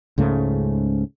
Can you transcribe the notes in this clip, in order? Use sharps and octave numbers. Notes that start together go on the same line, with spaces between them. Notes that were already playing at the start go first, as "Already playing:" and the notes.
C#2 G#2 C#3 A3